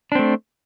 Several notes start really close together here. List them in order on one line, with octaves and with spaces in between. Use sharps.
D4 C4 A3